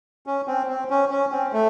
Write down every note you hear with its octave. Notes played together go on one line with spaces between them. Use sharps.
C#4
C4
C4
C#4
C#4
C4
A3